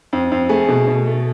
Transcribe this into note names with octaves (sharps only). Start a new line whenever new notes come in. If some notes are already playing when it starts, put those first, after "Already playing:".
F2
F2
A3 G#4
B2
B2
A3